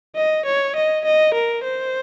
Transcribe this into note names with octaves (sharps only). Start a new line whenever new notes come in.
D#5
C#5
D#5
D#5
A#4
C5